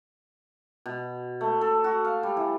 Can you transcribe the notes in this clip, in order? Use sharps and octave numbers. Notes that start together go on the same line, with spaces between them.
B2
A3
A4
F#4
F5
G3
E3